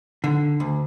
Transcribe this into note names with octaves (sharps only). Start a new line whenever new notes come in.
D3
D2